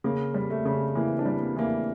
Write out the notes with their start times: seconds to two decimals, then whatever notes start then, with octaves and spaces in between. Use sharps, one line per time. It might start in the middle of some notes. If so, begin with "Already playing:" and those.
0.04 C#3 A#3
0.34 G3
0.50 A3
0.65 C#3
0.95 E3 A#3
1.19 D4
1.26 G3
1.41 A#3
1.56 E3 A#3
1.64 A3